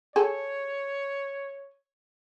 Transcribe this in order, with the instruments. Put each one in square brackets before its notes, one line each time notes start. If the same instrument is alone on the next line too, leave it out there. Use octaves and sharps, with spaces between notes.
[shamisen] G#4 A4 [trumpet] C#5